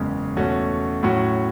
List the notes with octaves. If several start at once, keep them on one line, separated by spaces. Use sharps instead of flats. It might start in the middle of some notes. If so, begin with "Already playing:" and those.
Already playing: F#1 E2 C#3 G#3 C#4
E2 B2 A3 C#4 F#4
A2 F#3 C#4 F#4